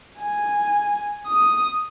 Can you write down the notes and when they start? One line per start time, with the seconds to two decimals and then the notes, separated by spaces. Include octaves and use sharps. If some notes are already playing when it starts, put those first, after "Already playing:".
0.19 G#5
1.27 D#6